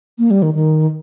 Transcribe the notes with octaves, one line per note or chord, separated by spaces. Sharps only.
A#3
G3
D#3
D#3